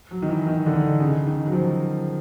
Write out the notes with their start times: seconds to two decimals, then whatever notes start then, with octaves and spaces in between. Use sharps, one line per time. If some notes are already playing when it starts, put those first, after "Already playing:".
0.11 F#3
0.22 D#3
0.29 E3
0.47 D#3
0.66 D3
0.73 D#3
1.00 C#3
1.27 D#3
1.47 F#3
1.53 F3